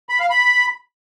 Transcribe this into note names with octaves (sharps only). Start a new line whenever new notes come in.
B5
F5
B5